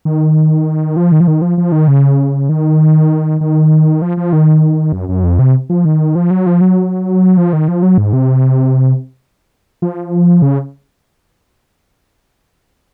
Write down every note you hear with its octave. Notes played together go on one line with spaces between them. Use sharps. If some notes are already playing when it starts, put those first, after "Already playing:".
D#3
F3
D#3
F3
D#3
F3
F3
D#3
C#3
D#3
D#3
F3
F3
D#3
F#2
F#2
F2
C3
F3
D#3
F3
F#3
F3
F#3
F3
D#3
F3
F#3
G#2
C3
F3
C#3